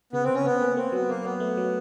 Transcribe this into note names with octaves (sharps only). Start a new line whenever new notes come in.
C#3 B3
C4
C#3
C#4
C#3 B3
A#3
A#3 C4
F#3 B3
F#3 A#3
F#3 B3
A3
F#3